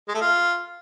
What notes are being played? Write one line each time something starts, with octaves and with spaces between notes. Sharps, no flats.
G#3
A3
F4